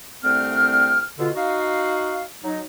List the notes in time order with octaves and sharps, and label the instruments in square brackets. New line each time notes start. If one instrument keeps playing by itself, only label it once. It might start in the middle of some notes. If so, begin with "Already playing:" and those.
[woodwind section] C2 D3 A3 C4 G5 F6
B2 D3 F4
D#4 F#4 F5
F#3 D#4